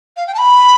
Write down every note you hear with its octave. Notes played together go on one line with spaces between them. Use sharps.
F5
G5
A5
B5